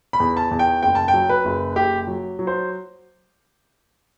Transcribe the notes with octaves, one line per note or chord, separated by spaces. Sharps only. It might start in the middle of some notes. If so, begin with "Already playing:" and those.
B5
E2
A5
E2
G5
F#1 G5
A5
G5
F#3
B4
F#1
F#1 G4
F#3
F#3
C5